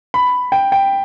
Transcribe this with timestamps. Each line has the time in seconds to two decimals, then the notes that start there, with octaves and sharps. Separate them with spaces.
0.14 B5
0.52 G5
0.72 G5